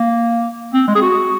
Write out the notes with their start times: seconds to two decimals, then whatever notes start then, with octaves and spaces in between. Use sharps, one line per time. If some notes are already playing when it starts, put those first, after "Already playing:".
Already playing: A#3
0.74 C4
0.88 G#3
0.95 G#4
1.02 F#4